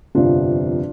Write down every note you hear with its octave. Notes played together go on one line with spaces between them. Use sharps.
G1 F2 C3 F3 D4 F4